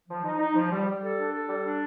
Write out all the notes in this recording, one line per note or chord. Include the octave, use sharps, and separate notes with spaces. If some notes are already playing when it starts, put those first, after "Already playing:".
F3
D#4
D#4
F3
G3
G3
A4
D4
A4
G3
D4